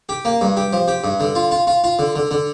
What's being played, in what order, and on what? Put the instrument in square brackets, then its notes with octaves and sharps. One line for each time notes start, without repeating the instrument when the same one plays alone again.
[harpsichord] G4
A#3
G2
G4
F3
G4
G2
D3
F4
F4
F4
F4
D3
D3
D3